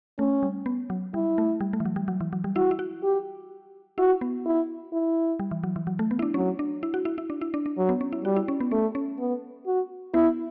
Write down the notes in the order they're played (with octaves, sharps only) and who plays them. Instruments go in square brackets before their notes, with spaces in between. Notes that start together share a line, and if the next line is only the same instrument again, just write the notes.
[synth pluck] A3 [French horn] C#4
[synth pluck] G3
B3
F#3
[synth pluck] G3 [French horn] E4
[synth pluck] A3
G3
A3
E3
F#3
G3
F#3
E3
F#3
G3
[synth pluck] E4 [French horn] F#4
[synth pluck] E4
F#4
[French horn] G4
[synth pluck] E4 [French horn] F#4
[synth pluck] B3
[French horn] E4
E4
[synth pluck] G3
E3
F#3
E3
F#3
A3
B3
E4
D4
[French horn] F#3 [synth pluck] C#4
[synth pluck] D4
E4
F#4
E4
E4
D4
E4
D4
D4
[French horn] F#3
[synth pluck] B3
C#4
E4
[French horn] G3 [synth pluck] F#4
[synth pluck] E4
C#4
B3
[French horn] A3 [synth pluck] C#4
[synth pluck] C#4
[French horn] B3
F#4
[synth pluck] B3 [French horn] E4